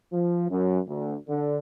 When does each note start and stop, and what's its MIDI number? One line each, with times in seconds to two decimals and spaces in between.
0.13 0.46 53
0.49 0.79 42
0.87 1.14 38
1.28 1.57 50